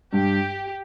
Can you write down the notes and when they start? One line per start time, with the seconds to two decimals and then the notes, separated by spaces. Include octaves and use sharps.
0.13 G2 G4